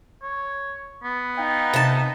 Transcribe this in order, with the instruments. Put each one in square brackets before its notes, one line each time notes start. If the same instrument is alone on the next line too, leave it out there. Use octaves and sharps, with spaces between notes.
[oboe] C#5
B3
[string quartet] D#4 [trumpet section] F5 G5
[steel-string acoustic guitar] C3 A5